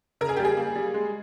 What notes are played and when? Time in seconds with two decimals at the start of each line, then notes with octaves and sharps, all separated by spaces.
0.21 C#3 A#4
0.29 G#4
0.37 G4
0.40 G3
0.45 G#4
0.57 A#3
0.76 G3
0.94 G#3